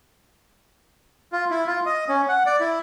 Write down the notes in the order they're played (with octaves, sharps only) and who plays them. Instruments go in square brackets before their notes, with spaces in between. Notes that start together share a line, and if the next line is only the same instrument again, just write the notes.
[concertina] F4
E4
F4
D#5
C#4
F#5
D5
E4